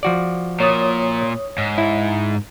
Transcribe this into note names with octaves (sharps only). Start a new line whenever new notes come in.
F3 F#4 D5
A#2 C#5 D#6
G#2
E4